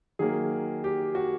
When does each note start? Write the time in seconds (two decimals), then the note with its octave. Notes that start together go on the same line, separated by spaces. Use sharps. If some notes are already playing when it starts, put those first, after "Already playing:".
0.19 D#3 F#3 A#3 G#4
0.84 G4
1.15 F#4